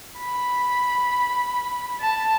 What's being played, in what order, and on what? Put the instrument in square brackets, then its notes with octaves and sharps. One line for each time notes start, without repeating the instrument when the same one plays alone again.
[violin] B5
A5